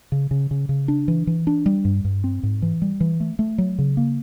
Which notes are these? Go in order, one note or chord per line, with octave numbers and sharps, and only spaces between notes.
C#3
C#3
C#3
C#3
D4
E3
E3
D4
G3
G2
G2
C4
G#2
E3
G3
E3
A3
A3
F#3
C#3
A#3